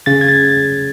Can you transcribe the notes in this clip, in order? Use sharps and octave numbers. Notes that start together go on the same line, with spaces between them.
C#3 A6
G#6
A6